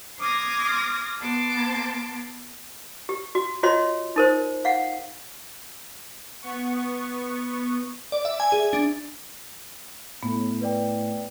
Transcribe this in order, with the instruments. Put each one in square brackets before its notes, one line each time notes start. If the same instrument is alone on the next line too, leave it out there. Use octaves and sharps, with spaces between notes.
[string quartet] C6 D6 D#6 F6 G#6 A#6
B3 A5 C6 D6
[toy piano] G4
F#4
F4 F#4 C#5 D#5 C6
D#4 A#4 C5
F5 F#5
[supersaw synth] B3 C#6
[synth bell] D5
E5
G#5
G#4
D4
[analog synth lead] A2 [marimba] B3
[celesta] B4 D5 G5